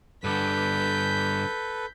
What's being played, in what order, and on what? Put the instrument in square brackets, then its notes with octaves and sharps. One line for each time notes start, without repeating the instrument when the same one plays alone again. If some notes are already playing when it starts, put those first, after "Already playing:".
[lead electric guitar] G2 D3 [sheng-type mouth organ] A4 B4 [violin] G6 B6